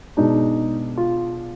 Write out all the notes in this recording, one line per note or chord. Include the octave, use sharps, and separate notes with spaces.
B2 G#3 D4 D#4
F4